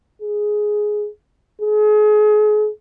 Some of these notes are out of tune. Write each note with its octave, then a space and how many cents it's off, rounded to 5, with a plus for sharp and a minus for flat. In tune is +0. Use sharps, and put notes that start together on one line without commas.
G#4 +10
G#4 +35